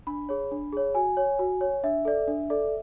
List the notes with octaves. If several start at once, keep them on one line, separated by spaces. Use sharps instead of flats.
D4 B5
G#4 C#5
D4
G#4 C#5
F#4 G#5
C#5
F#4
C#5
D4 E5
A4 D5
D4
A4 D5